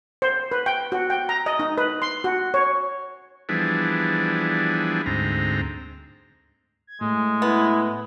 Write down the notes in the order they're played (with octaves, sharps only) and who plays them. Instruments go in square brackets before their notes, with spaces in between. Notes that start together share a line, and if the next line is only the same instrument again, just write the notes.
[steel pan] C5
B4
G5
F#4
G5
A#5
D#5
D#4
B4
C6
F#4
C#5
[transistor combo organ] E3 F3 G3 B3 D4 G#4
D2 G#2 C4 A#5
[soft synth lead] G#6
[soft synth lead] A2 [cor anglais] G#3
[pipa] B3 [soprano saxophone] E4